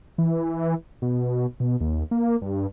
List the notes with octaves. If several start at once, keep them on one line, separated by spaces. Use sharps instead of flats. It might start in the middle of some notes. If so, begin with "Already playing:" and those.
E3
B2
B2
D#2
A#3
G2